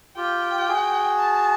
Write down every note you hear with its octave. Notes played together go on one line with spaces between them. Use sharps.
F4 G4 G5
G4
F#4 G#4
A5